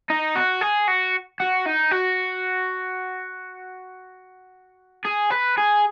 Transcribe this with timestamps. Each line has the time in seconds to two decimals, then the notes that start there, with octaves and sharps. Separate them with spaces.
0.10 D#4
0.35 F#4
0.61 G#4
0.88 F#4
1.40 F#4
1.66 D#4
1.92 F#4
5.05 G#4
5.31 B4
5.58 G#4